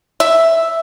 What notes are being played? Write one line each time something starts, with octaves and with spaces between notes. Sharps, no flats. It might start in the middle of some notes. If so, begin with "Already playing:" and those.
E5